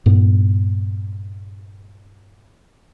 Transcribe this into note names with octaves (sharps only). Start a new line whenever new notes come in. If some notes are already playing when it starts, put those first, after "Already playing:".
G2 A#2 B3